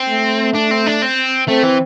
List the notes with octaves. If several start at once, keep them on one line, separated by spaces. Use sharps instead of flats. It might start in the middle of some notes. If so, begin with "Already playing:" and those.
Already playing: C4
A3
D4
C4
D4
C4
A3 C4
E3